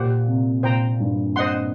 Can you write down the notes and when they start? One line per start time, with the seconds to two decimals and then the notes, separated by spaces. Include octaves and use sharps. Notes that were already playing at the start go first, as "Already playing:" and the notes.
Already playing: A#2 G4 C5 F#5
0.27 C3
0.63 A#2 C5 G5 A#5
1.00 G2
1.36 C5 D#5 F#5 C6